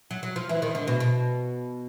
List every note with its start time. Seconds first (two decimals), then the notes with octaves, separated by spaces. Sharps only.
0.11 F#3
0.23 F#3
0.36 F3
0.49 E3
0.62 D#3
0.75 D3
0.87 B2
1.00 B2